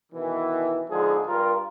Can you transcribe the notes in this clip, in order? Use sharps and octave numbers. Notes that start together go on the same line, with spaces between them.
B2 D#3 E3
D3 F3 G#3 D#4 G#4
G2 F4 A#4